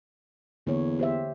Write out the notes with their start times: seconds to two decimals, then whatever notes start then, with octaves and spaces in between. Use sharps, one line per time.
0.67 E2 D3 A#3 C#5
0.99 G4 C5 E5